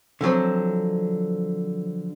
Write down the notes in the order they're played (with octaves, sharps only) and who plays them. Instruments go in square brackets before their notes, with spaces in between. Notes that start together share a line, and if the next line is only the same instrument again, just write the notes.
[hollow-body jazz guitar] D3 F3 F#3 C4